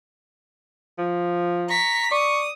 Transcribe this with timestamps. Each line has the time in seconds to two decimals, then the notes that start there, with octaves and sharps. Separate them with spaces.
0.98 F3
1.69 A#5 C#6 B6
2.11 D5 C#6 D#6